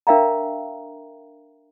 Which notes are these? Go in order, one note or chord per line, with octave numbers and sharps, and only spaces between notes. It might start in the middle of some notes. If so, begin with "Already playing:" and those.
D4 A#4 E5 F5 G5 A#5